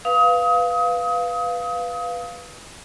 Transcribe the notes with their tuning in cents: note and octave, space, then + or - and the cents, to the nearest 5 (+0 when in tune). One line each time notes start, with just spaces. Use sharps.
B4 +0 F5 +0 D#6 +30